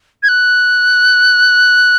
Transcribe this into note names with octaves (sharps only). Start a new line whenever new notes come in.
G#6
F#6